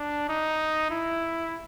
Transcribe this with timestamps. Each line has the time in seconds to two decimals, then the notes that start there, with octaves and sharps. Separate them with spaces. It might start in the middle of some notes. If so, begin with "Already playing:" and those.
Already playing: D4
0.29 D#4
0.90 E4